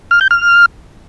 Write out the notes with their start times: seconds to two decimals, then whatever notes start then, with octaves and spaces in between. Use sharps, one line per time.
0.11 F6
0.21 G6
0.31 F6